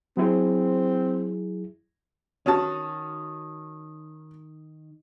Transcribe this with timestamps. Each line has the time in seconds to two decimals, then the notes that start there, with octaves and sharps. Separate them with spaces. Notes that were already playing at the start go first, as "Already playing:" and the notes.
0.17 F#3 C4 E4 G#4
2.46 D#3 C#4 F#4 A5